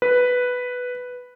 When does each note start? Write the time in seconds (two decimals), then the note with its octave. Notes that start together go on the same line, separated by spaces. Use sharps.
0.02 B4